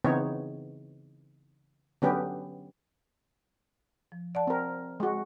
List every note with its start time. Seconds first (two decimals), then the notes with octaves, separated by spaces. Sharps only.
0.05 C#3 E3 B3 C4 D#4 C#5
2.02 D3 F#3 B3 C#4 G4 B4
4.12 F3
4.35 D5 F#5 A5
4.47 C4 A#4
5.00 G#3 F#4